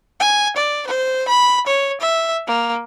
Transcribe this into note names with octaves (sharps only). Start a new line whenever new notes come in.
G#5
D5
C5
B5
C#5
E5
A#3